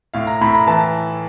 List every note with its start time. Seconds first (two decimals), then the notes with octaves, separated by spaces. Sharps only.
0.14 A2 F5
0.27 A#5
0.41 A2 B5
0.55 A#5
0.67 E3 A5